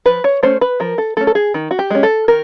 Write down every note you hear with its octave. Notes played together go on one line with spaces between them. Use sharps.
F3 B4
C#5
A3 C#4 C5
B4
F3 A#4
A4
A3 C#4 A4
A4
G#4
D#3
F#4
G4
G#3 C#4
A4
D#3 A#4